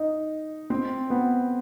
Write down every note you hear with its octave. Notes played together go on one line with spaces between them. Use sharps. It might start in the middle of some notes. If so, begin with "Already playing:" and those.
Already playing: D#4
C4
B3